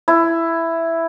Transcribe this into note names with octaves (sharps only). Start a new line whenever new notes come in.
E4